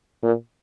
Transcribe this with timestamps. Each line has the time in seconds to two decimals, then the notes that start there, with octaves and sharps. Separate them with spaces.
0.23 A#2